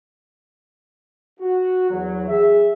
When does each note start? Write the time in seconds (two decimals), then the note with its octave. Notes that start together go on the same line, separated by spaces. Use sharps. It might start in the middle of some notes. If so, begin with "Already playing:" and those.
1.40 F#4
1.89 E2 F#3
2.28 G#4 E5